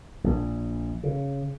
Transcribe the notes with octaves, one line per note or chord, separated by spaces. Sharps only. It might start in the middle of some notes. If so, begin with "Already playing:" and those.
A#1
C#3